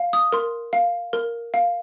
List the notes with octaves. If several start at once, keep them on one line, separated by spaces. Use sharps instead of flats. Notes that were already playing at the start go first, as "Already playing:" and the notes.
Already playing: F5
D#6
A#4 C6
F5
A#4
F5